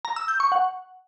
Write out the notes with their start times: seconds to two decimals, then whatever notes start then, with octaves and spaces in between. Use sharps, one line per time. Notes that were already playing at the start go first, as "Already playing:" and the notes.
0.05 A#5
0.16 E6
0.28 G6
0.40 C#6
0.52 F#5